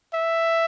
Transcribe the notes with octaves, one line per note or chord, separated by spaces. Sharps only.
E5